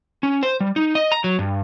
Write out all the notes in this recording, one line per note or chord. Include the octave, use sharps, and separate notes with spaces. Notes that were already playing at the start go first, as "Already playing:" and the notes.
C#4
C5
G3
D#4
D#5
A#5
F#3
G2